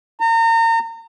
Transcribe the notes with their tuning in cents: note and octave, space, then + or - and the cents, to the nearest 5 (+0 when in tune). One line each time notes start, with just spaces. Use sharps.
A#5 -35